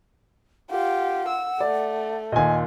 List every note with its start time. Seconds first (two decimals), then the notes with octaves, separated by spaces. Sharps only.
0.71 F4 G4 F#5
1.28 E6
1.60 A3 D5
2.32 D#2 A#2 D#5 G#5